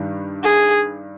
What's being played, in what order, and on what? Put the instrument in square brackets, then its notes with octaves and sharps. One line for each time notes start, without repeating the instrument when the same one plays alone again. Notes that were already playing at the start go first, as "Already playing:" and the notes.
Already playing: [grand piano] G2 D#3 G3
[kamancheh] G#4